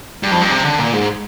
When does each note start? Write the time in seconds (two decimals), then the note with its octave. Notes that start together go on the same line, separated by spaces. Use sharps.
0.23 G2
0.32 F2
0.41 G2
0.51 C3
0.65 D3
0.79 A#2
0.93 G#2